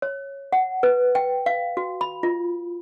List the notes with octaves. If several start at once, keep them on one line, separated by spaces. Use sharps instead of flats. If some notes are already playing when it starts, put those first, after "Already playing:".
C#5
F#5
B4
G5
F5
F#4
B5
F4